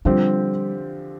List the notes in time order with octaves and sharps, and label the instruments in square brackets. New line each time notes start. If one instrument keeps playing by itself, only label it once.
[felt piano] D3 F3 C4 G4 [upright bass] G3